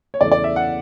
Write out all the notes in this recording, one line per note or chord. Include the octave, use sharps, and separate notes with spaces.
C#5
E2 C#3 E3 A3 D5
D5
E5
F#5